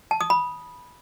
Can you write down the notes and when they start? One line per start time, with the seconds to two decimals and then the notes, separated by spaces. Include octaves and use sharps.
0.11 A5
0.21 D#6
0.30 B5